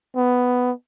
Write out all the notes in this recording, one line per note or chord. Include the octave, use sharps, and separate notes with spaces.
B3